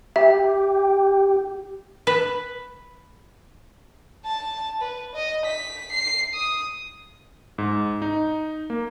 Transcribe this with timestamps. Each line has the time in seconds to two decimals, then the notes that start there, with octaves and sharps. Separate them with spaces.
0.16 G4 E5
2.07 B4
4.25 A5
4.81 B4
5.15 D#5
5.46 B6
5.91 C7
6.34 D#6
7.58 G#2
8.02 D#4
8.70 A#3